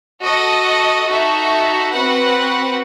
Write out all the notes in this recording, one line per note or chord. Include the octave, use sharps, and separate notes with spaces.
F#4 A4 D#5
D#4 F#4 A4 E5
C4 F#4 B4 F#5